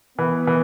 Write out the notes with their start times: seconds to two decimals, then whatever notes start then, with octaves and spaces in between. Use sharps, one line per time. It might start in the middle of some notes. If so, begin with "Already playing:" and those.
0.18 E3 B3
0.47 E3